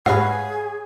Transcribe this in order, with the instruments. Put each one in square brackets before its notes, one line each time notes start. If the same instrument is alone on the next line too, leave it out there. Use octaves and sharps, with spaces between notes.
[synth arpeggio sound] G#2 G4 A#6 [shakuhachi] G#4 [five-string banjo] B4 C#5 F5 [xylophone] F#5